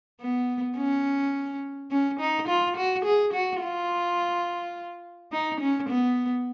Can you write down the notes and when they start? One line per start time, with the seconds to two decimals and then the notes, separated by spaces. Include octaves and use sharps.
0.21 B3
0.77 C#4
1.91 C#4
2.20 D#4
2.48 F4
2.76 F#4
3.05 G#4
3.33 F#4
3.61 F4
5.32 D#4
5.60 C#4
5.89 B3